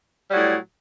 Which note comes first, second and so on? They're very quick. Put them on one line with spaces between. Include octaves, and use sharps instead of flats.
G3 F#3 A2